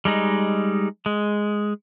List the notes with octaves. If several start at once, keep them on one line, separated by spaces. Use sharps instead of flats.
G3 G#3 D#4
G#3